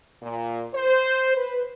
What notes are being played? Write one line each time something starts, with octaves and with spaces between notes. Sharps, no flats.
A#2
C5
B4